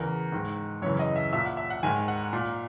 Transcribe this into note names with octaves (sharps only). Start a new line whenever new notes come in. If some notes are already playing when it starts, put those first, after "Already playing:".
Already playing: E2 C#3 E3 A#4
G#2 D#3
F#2 C#3 E3 C#5
D#5
E5
A#2 E5
F#5
E5
F#5
G#2 D#3 G#5
F#5
A#2